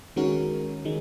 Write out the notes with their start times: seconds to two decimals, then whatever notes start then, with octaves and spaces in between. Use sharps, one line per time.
0.16 D#3 G#3 C#4 F#4 A#4
0.85 D#3 G#3